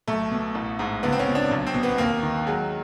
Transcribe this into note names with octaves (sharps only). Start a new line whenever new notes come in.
B1 A3
B2
A1
G#2
C#2 B3
C4
C#4
B2
D4
B1
C4
B2
B3
D#2 A#3
D#3
F#3 G#3